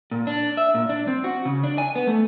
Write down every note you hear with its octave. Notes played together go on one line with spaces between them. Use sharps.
A#2
D4
E5
A#2
D4
C4
F#4
C#3
D4
G#5
B3
A3